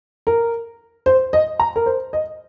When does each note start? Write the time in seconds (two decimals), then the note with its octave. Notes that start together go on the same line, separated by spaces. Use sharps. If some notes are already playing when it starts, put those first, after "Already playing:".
0.27 A#4
1.06 C5
1.33 D#5
1.60 A#5
1.76 A#4
1.86 C5
2.13 D#5